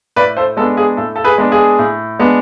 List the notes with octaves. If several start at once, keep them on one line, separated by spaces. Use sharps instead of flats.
A2 B4 D5
A4 C5
G#3 B3 D4 A4
G#4
A2 A4
A4
G#4 B4
G#3 B3 D4
G#4
A2
G#3 B3 D4